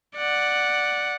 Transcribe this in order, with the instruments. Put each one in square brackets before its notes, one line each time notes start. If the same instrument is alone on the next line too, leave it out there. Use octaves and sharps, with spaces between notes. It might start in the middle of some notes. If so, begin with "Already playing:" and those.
[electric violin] D5 F#5